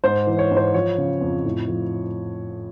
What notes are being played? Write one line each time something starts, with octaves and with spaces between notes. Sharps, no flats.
G#2 C5
E3
C#5
G#2
C5
F3 C#5
C#3
F2
A2
F3